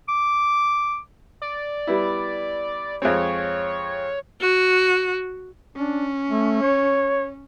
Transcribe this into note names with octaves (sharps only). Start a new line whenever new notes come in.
D6
D5
G3 B3 E4
F2 G#3 C4 C#5
F#4
C#4 D4
A3
C#5